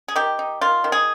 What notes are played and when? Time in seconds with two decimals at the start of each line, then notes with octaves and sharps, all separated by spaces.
0.08 G#4
0.16 D#3 G4
0.39 D#4
0.61 D#3 F4
0.84 D#3
0.92 G#4